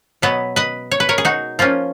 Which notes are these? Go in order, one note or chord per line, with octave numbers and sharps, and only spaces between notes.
B2 F#3 B3 B4 D#5
B4 D#5
C#5
B4
A#4 C#5
G#4
D#4 F#4
F3 A#3 C#4 F4